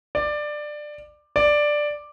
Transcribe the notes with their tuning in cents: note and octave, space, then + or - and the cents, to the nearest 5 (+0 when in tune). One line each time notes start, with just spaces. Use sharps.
D5 +15
D5 +5